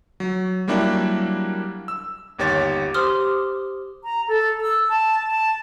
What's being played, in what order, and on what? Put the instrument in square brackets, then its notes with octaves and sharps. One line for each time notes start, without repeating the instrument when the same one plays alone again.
[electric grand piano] F#3
F#3 G3 A#3 D4 E4 G4
E6
G1 D#2 G4 C#5 A6
[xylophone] G4 C5 C6 D6 D#6 F6
[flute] A#5
A4
E6
A5
A5